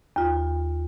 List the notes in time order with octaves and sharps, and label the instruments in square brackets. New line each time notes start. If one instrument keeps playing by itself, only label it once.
[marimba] D#2 F4